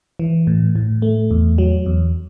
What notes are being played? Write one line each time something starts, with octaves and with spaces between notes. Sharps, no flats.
E3
A2
A2
A3
E2
F#3
E2